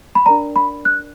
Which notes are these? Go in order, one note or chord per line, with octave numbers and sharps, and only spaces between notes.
B5
D4 A#4 D5 A#5
B5
F#6